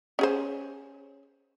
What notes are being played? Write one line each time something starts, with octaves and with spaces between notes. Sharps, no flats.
C#4 G#4 C5